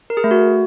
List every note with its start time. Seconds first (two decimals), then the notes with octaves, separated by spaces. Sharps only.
0.10 A#4
0.17 G#4
0.24 A3
0.31 F#4